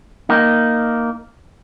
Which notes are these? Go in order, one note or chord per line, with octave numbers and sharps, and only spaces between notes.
A#3 D#4